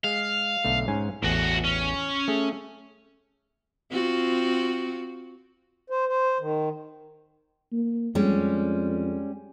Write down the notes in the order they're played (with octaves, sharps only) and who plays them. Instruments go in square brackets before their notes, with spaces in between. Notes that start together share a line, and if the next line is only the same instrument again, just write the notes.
[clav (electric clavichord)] G#3 [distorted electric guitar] F5
[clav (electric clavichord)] B1 D3 A3
G#2 C#4 G#5
[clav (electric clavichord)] A1 E2 [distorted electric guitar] A2 F#4
[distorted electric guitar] C#4
[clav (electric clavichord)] A3 G#4
[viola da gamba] C4 F4 F#4
[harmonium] C5
C5
D#3
[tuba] A#3
[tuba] F2 [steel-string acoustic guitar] G3 G#3 C#4